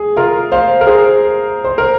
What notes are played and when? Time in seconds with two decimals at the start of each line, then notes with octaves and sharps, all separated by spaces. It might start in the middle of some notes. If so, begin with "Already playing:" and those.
Already playing: G#4
0.17 F4 A#4
0.52 C5 F5
0.81 A#4
0.87 G#4 C5
1.64 C5
1.78 A#4